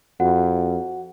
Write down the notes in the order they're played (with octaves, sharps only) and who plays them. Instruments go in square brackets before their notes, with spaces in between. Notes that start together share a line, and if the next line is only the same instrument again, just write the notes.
[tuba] F2 [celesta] F#4 F#5